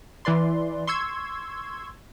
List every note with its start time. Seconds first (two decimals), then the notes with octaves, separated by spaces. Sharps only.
0.25 E3 B4 D5 C6
0.87 C6 C#6 E6 G#6